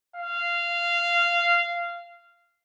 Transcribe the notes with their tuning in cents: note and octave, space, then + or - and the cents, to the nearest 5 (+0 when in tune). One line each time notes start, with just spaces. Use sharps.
F5 -15